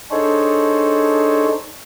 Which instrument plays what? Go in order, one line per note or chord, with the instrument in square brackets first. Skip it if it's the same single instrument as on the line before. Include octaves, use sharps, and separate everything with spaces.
[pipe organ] D4 D#4 G#4 A4 C5 C#5